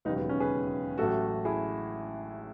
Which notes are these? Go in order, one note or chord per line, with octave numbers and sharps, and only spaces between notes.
E1 D#2 C#3 F#3 B3 D#4
B3
C#4
G#4 B4
A1 A2 F#3 A3 F#4 A4
E4 G#4